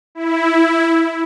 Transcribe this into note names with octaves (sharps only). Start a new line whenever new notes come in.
E4